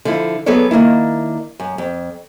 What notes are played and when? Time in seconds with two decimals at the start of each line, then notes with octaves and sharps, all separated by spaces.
0.05 D3 F3 E4
0.46 F#3 B3 G#4 A4 C#5 D5
0.71 D#3 A#3 D4 E4
1.60 F#2
1.78 F2